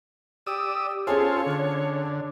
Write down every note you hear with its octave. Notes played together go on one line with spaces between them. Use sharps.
G4 D5 D#6 E6
C#4 F4 G#4 A4 C5 C#5
D3